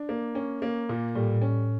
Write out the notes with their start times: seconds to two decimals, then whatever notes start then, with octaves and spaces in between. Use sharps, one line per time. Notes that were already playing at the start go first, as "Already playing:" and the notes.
Already playing: D4
0.09 A#3
0.35 C#4
0.62 A#3
0.89 A#2
1.15 A2 G3
1.41 C#4